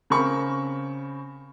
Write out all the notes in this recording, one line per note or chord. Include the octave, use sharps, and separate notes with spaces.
C#3 C4 A#4 B5 C#6